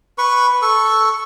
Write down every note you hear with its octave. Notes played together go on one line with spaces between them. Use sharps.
B4 C#6
A4 C#6